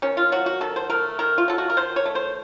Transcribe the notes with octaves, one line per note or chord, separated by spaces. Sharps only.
D#3 C#4
F4
F#3 F#4
F#4
D#3 A4
C5
A3 A#4
D#3 A#4
F4
F#3 A4
F#4
A#4
D#3 C5
C#5
A3
C5